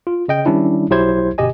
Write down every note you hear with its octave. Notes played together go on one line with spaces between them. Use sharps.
F4
C#3 D#5 G5
D#3 G3 C#4 D4 E4
B1 F#3 E4 G4 C5 G#6
G1 B2 G4 D#5 G#5